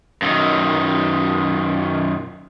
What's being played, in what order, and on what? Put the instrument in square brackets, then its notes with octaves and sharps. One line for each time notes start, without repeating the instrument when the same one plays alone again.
[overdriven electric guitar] F#2 D#3